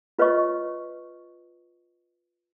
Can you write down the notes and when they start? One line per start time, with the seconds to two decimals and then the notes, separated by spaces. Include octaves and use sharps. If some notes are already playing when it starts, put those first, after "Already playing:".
0.19 F4 B4 C#5 D#5 C#6